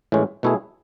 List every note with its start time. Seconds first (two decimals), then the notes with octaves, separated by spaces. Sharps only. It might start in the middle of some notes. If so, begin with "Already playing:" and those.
0.12 A2 E3 G#3 C#4
0.43 B2 A3 E4 G#4